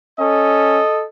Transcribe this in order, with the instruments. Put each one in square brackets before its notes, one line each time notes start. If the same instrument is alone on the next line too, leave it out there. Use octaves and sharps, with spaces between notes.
[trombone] C#4 [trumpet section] A4 D#5